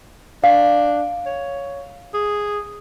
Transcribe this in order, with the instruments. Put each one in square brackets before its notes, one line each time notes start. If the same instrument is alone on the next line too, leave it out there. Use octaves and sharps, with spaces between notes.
[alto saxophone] D4 [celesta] F5
[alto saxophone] C#5
G#4